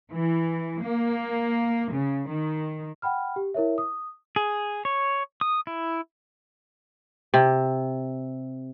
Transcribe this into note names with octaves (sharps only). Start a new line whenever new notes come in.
E3
A#3
C#3
D#3
F#5 G5 B5 F6
G4
E4 A#4 C#5 E5
D#6
G#4
C#5
D#6
E4
C3